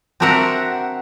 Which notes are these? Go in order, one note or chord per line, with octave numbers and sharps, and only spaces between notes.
C4 D4 F#4 A#4 E5 F#5